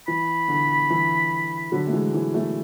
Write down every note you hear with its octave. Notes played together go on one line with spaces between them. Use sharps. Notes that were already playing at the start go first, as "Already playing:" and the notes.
E3 B5
D3
E3
D3 F#3
A3
E3 G#3
E3 G#3
F#3 A3